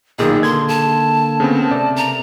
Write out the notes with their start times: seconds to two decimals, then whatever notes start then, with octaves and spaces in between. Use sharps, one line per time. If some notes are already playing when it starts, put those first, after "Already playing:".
0.19 B1 A#2 D#3 D#4 G#4
0.43 D3 A#3 A4 C6 G#6
0.68 A5
1.40 C#3 B3 C4
1.71 C3 A3 D5
1.96 A#5